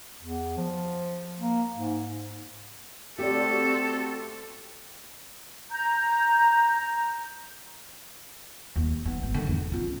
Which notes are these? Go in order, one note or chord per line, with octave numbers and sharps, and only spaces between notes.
E2
F3
A#3
G#2
A3 C4 F#4 G4 A4 D5
A#5 G6
D#2
B3
G#1
D3 D#3
E2
C#4 F4